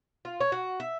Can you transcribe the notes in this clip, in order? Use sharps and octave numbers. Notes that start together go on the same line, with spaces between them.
F4
C#5
F#4
E5